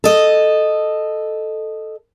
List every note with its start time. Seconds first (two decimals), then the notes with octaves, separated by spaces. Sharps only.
0.04 A4 D#5